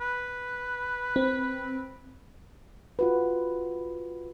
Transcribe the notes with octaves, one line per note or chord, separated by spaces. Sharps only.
B4
C4
F4 F#4 B4